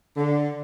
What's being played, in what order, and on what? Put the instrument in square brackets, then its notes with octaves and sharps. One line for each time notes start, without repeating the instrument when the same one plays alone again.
[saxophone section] D3